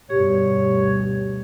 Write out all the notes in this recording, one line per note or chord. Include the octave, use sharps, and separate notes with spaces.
D2 G2 B2 G4 C#5